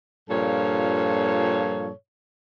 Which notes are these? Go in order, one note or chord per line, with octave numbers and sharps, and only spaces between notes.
G2 A#2 F3 A4 C#5